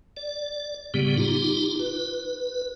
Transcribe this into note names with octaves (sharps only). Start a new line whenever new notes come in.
D5
A2 C#3 G3 B3 G4
D#4 F4 G4
B4